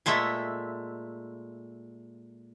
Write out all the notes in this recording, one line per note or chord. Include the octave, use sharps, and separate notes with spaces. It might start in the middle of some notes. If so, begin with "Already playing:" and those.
A#2 G#3 A3 E5